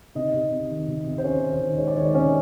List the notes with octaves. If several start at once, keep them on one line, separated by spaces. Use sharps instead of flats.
C3 D#4 D#5
C3
C3
D#3
C3
C3
C5
D#3 C#4 C#5
D#3
C5
D#3
G#3 C#5
D5
D#3 C#5
D5
C3 C#4 C#5